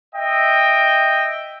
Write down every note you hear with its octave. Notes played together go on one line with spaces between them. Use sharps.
D#5 E5 G5